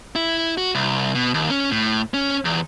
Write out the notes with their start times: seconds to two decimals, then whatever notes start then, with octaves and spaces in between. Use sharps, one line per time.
0.15 E4
0.58 F#4
0.75 C2
1.15 B2
1.34 D#2
1.50 C#4
1.71 A2
2.14 C#4
2.45 E2